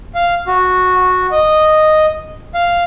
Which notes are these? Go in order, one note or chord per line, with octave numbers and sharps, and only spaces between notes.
F5
F#4
D#5
F5